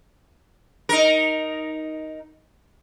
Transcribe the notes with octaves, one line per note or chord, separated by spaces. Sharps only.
D#4 A#4